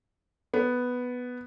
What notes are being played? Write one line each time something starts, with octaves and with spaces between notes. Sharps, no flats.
B3